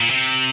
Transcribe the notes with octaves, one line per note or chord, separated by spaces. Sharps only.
A#2
C3